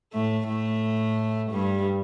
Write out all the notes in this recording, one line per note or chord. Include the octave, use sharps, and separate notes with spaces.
A2 A3
A2 A3
G2 G3